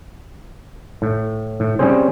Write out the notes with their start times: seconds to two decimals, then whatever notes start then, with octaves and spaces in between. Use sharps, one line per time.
1.02 A2
1.60 A2
1.79 G3 C4 C#4 G#4 C5